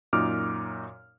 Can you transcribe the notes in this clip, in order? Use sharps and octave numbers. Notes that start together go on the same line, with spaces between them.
F#2 A#2 D#4 D6 F6